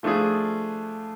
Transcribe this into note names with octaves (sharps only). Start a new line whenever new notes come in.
F3 A3 D4 F4 G#4